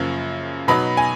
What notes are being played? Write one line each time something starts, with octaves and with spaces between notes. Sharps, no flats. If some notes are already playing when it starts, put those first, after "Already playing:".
Already playing: F#2 C#3 F3 A#3
B2 F#3 B3 D#4 B5
G#5